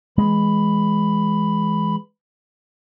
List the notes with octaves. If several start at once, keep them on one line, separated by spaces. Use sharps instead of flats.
E3 G#3 B5